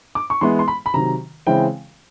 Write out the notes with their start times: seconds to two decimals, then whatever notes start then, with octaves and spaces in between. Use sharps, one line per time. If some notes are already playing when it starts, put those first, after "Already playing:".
0.15 D6
0.30 C#6
0.41 E3 G#3 B3 E4 C6
0.59 C6
0.68 B5
0.86 B5
0.94 C3 D#3 F#3 A#5
1.47 C#3 E3 G#3 C4 E4 G5